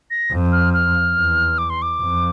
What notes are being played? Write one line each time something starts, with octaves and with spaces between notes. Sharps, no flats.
A#6
F2
F6
F6
E2
D6
C6
D6
F2